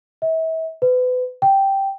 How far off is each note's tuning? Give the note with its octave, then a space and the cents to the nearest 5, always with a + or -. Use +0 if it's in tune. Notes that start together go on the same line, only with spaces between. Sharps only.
E5 -35
B4 +30
G5 -5